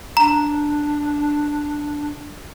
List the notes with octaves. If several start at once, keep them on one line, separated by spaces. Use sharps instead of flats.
D4 A#5